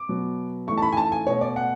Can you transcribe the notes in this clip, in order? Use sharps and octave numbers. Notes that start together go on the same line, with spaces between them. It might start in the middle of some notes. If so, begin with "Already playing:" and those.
Already playing: D6
B2 F#3 B3
G#2 E3 A3 C#6
A5
B5
G#5
A5
G#5
B2 A3 C#5
D5
F#5